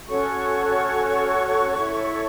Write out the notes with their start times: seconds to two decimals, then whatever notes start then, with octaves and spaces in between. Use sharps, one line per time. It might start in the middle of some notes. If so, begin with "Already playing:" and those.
0.08 C#4 F#4 A4 C#5 C#6
1.77 E4 A4 C#5